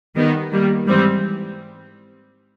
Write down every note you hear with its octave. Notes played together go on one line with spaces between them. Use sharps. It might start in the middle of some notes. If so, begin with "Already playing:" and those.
D#3 G3 B3 D#4
D#3 G3 A#3
G#2 E3 G3 C4